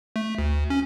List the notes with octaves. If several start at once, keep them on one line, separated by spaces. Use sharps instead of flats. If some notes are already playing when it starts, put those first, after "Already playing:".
A3
D2
C#4